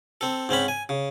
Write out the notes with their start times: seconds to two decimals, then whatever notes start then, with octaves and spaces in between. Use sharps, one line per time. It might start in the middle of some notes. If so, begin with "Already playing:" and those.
0.21 C4 A4
0.49 G#2 C4 C#4 B5
0.68 G#5
0.89 C#3